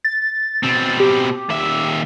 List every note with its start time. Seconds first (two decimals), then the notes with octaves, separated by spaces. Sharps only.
0.05 A6
0.63 B2 C4
1.00 G4
1.50 D#2 E5